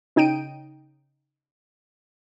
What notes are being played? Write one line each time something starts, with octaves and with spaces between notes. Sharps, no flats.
C#3 D#4 G5 D7 D#7